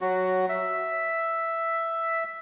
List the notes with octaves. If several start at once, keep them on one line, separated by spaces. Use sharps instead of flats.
F#3 F#4
E5